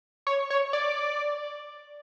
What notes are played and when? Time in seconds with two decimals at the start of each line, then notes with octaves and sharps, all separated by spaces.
0.27 C#5
0.50 C#5
0.73 D5